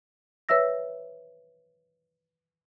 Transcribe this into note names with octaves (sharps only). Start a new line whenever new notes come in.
B4 C#5 E5 E6 A#6